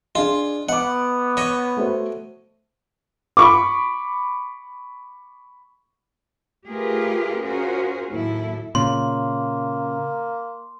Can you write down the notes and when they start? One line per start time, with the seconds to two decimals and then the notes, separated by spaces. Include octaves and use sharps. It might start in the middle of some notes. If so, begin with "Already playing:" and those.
0.15 D4 F4 G#4 D#5
0.69 B3 D#5 F#5 D6
1.37 C#5 D#5 D6
1.77 A3 F#4 C5
3.37 B5 C#6 D6
6.68 A3 F4 G4 G#4 A#4 B4
7.41 C#4 F4 F#4 G#4 A#4 C5
8.12 D#2 A2 F#3 E4 A4
8.75 A#2 C#3 A#3 C6